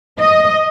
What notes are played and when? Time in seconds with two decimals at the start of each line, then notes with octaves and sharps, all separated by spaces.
0.18 D#5